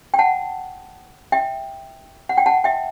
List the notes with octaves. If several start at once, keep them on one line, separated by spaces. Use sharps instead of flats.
G5
F#5 A5
E5 G5
F#5
G5
F#5 A5
E5 G5